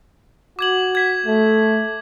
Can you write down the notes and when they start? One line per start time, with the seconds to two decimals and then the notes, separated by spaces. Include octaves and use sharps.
0.59 F#4 D6 G#6 F#7
0.95 G#6 B6
1.26 A3